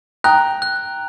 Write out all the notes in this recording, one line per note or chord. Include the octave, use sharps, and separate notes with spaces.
G5 A#5 F#6
F#6